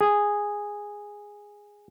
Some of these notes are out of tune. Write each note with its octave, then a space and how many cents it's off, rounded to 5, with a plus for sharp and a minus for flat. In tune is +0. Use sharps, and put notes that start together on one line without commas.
G#4 -10